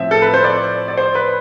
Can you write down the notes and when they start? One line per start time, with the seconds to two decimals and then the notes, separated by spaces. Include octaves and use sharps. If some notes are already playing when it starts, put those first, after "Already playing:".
Already playing: A2 F3 C4 E5
0.11 A4
0.22 B4
0.34 C5
0.44 D5
0.88 D5
0.97 C5
1.15 B4